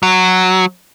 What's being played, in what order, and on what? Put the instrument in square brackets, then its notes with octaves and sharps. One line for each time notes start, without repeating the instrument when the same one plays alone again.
[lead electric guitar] F#3